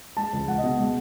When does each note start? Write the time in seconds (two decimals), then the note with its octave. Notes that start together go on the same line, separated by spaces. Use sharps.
0.17 G#3 A5
0.33 C#2
0.48 C#2 F#5
0.58 D#5
0.64 B2
0.79 G#3